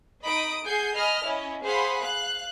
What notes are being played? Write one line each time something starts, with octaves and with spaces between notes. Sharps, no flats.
D#4 D#5 B5 D#6 D7
G#4 F#5 G#5 G6 C7
D#5 G#5 B5 F6
C#4 E4 D#5
G#4 C5 F5 F#5 B5 C6
F5 F#6